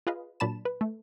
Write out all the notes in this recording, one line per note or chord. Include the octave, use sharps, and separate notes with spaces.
F4 G#4 B4 D#5 F5
A#2 F#3 D4 A5 B5 E7
B4
A3